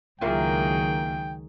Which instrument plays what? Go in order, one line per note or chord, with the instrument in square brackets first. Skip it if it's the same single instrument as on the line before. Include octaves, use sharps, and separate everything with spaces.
[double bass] C#2 D#3 [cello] F#3 G#4 [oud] A#3 E4 F4 [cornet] G5